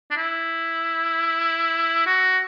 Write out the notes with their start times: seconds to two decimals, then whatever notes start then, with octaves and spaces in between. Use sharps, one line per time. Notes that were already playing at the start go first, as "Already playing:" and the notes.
0.11 D4
0.16 E4
2.06 F#4